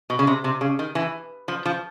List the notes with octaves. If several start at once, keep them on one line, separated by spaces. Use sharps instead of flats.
B2
C#3
C3
C3
C#3
D#3
E3
F3
F3